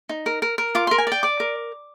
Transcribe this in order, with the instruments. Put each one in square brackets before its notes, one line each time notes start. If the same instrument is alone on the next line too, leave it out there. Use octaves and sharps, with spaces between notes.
[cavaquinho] D#4
A#4
A#4
A#4
F4 D6
A#4 C6
G#5
D5 G5
D5 D6
A#4